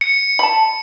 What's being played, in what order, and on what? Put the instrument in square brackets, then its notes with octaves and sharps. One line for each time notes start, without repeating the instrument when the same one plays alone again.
[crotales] C#7
[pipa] A5 B5